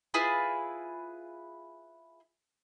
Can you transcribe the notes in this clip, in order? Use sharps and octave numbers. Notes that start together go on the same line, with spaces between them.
E4 F4 G#4 B4